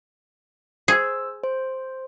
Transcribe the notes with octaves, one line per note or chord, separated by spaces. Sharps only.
G#4 C5 E6
C5